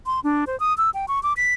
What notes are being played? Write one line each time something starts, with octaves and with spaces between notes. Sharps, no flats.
C6
D4
C5
D#6
E6
G5
C#6
D6
B6